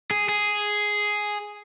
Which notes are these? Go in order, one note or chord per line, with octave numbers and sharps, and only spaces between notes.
G#4
G#4